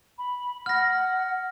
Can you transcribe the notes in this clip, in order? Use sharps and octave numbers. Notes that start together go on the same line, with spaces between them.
B5
F#5 F6 A#6